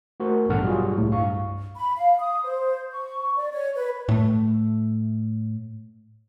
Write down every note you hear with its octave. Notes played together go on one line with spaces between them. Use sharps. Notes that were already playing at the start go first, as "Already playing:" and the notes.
A3 F#4 A#4 C5
A1 G2 B2 A4 F#5 F6
F#3 G3 F4 F#4 G#4
C2 A2
G2 F5 C#6
B5
F5
D#6
C5
C#6
D5
C#5
B4
A2 A3